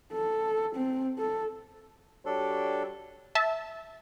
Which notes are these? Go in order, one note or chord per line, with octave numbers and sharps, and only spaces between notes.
A4
C4
A4
G3 D4 F#4 A4 C#5
E5 A5